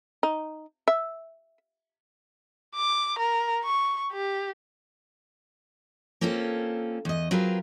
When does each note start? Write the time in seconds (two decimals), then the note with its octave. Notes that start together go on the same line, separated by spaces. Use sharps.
0.23 D#4
0.88 E5
2.76 D6
3.19 A#4
3.64 C#6
4.12 G4
6.21 A#3 C4 C#4 F4 A4
7.05 E2 D#5
7.31 F#3 C4 F4 G#4 A#4 B4